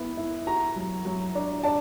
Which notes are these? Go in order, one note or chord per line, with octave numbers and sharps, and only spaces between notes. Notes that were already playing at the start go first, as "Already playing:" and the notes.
Already playing: B3 E4
E4
F#4 A#5
F#3
F#3
D4
D4 A5